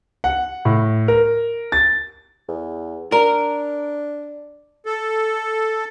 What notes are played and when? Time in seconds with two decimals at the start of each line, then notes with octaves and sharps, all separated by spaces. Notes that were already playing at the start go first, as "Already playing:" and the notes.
0.24 F#5
0.65 A2
1.08 A#4
1.72 A6
2.48 E2
3.12 D4 A#4
4.86 A4